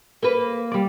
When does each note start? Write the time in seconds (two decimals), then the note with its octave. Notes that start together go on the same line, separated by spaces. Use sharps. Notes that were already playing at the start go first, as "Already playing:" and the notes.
0.23 A#3 B4
0.72 G3 D5